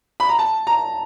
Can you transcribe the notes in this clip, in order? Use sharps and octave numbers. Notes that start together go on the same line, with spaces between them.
B5
A#5
A5
A#5